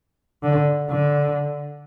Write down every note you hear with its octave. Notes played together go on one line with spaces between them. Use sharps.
D3
D3